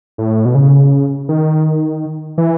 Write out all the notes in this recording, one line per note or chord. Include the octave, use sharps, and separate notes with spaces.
A2
B2
C#3
D#3
E3